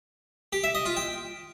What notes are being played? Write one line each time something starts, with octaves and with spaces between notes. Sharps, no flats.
G4
E5
D#5
F4
G5